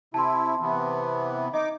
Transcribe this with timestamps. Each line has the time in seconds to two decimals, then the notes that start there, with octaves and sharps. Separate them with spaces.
0.14 C3 E4 A5 C6
0.61 C3 E3 B3
1.54 D#4 D#5 D6